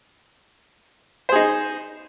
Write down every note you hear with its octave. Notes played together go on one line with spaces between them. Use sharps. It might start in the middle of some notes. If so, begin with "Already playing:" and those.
D#4 G#4 C5